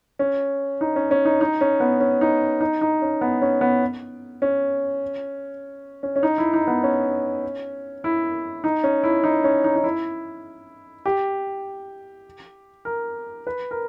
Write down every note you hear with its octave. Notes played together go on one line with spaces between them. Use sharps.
C#4
D#4
C#4
C#4
D#4
D#4
C#4
B3
C#4
D#4
D#4
D#4
C#4
B3
C#4
B3
C#4
C#4
C#4
D#4
E4
D#4
B3
C#4
E4
D#4
C#4
E4
D#4
C#4
D#4
D#4
E4
G4
A#4
B4
A#4